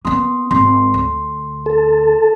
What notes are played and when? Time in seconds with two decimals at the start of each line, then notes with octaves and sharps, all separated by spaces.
0.05 A#3 B3 C6 D#6
0.51 G#1 C6
0.94 D2
1.66 A4